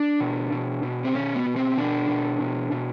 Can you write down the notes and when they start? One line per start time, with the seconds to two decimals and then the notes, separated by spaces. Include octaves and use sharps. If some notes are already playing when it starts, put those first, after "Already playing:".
Already playing: D4
0.20 B2
0.52 B2
0.83 B2
1.04 C4
1.15 B2 C#4
1.35 B3
1.46 B2
1.56 C4
1.77 B2 D4
2.09 B2
2.40 B2
2.72 B2